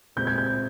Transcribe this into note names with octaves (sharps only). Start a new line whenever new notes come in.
A#2 G#3 C4 G6
G#6
G6